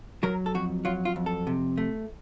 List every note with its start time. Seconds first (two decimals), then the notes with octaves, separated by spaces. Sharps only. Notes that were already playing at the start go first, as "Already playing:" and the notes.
0.23 F#3 A#4
0.46 A4
0.54 F2 F#4
0.85 F#3 F4
1.05 F4
1.16 F2
1.26 A4
1.47 C3
1.78 A3